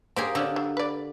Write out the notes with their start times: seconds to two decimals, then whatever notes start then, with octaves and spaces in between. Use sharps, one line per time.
0.16 D3 A#3 C#4 G4 G#4 C5
0.35 D3 C4 C#4 D5
0.56 F#3
0.77 B4 D5